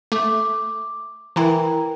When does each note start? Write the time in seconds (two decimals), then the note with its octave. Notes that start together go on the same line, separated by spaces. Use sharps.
0.12 A3 D6
1.36 E3 E4 A#4 G5 A#5